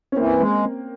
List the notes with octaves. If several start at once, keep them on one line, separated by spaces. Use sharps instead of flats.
C#4
E3 A#3 C4
G#3